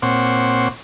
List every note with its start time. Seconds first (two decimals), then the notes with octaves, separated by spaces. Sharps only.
0.02 A#2 C4 C5 C#5 F#5 D6